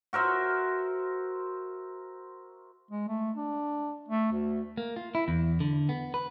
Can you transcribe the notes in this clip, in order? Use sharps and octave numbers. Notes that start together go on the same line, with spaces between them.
F#4 A#4 C5 E5
G#3
A3
D4
A3
D2
A#3
F4
E4
E2
D3
B3
B4